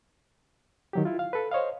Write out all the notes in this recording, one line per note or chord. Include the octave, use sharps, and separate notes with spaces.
D#3 F#3 G4
E4 F4
F5
A4 B4
C5 C#5 D#5 F5